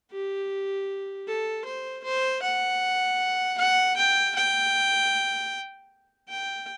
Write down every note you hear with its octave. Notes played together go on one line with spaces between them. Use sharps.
G4
A4
C5
C5
F#5
F#5
G5
G5
G5